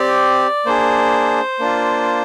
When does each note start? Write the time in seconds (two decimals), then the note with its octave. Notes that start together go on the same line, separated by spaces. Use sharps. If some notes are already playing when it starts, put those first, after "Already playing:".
Already playing: C4 G4 D5
0.66 A#3 D4 G#4 C5
1.59 A#3 D4 F4